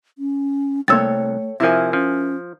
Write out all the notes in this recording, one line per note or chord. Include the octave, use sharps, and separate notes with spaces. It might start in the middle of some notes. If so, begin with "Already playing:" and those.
C#4
C2 A3 A#3 A4 C#5 G5 E6 A6
C3 F3 E4 A#4 E5 G#5
F3 C#4